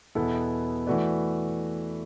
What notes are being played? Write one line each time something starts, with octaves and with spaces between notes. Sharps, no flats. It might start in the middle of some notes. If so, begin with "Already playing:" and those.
E2 B2 B3 E4 A4
E3 A3 F#4 B4 D5